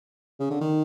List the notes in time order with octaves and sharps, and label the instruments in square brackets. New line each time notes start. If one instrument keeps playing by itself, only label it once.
[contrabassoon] C#3
D3
D#3